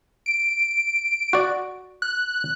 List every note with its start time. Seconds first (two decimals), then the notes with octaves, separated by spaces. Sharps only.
0.26 D7
1.33 F#4 D5
2.02 F#6